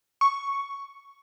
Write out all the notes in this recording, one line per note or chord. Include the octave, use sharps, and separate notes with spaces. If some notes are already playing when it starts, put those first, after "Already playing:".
C#6